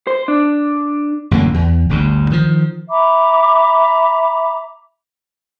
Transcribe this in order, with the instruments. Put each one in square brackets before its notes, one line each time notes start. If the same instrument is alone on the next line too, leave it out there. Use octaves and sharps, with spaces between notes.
[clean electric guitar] C5
D4
[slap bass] A1 F#2 D3 A#3
E2
G1 D2 G2
D#3 F3
[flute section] E5 A#5 B5 D6